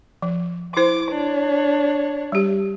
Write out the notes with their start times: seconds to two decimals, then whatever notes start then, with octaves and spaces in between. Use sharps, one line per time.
0.22 F3
0.77 E4 C5 D6
1.10 D4 C#5
2.32 G3 G4